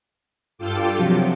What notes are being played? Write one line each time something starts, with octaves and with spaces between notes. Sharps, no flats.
G2 F4 A4 G5 D6
C3 F3 F#3